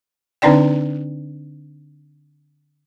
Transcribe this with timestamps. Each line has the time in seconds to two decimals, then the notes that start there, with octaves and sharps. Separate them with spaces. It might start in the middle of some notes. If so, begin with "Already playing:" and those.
0.42 D3 C4 D4 D#4 D5 G5